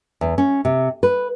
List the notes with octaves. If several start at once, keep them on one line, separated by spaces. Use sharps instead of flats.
E2
C#4
C3
B4